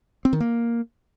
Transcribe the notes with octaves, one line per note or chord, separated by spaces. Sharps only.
C4
D#3
A#3